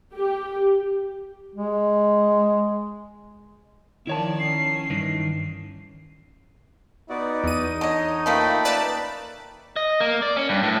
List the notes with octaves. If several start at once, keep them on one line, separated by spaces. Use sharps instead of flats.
G4
G#3
D#3 F3 E4 C#5 D5 A5
C#4 C7
G2 D#3 E3
B3 D#4 F#4 D5
E2 D#7
D3 C#5 D#5
F3 A3 A#3 C#4 G5 B5
B4 D5 A5
D#5
A#3
D5
C#4
G2
A2